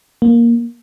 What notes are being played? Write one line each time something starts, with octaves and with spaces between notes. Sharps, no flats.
A#3